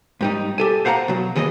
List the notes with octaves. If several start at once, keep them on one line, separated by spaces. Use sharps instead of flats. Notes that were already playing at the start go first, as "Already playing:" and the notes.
G#2 G3 D#4
G4 A4 G#5
C5 F5 F#5 G#5 A#5
B2 F#3
D#2 E3 G#4 C#5 D#5